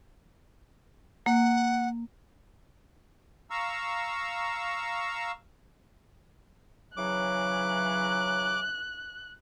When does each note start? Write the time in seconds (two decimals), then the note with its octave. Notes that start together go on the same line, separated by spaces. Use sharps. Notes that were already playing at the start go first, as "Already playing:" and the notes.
1.26 A#3 F#5
3.50 F5 A#5 C#6 E6
6.97 C#3 E3 F#3 D6 F#6